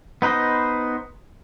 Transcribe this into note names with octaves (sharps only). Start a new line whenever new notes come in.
B3 D#4 B4 C5 D#5